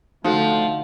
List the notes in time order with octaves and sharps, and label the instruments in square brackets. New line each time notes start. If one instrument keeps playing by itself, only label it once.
[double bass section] D3 A3 [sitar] F3 [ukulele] D#4 F#4 A4